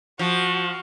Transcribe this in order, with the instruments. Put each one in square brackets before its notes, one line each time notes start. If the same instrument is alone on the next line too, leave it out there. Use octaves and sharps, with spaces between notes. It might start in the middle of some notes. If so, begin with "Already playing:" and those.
[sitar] F3 [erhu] F#4